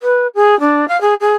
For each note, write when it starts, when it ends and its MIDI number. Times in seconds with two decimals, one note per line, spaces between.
0.01 0.27 71
0.35 0.58 68
0.60 0.88 62
0.88 0.99 77
1.01 1.14 68
1.20 1.34 68